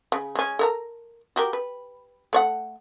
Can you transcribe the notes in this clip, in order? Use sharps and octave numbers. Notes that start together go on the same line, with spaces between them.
C#3
G#3 C#4
A4 A#4 A#5
F#4 G4 A#4
B4
A3 C#5 F#5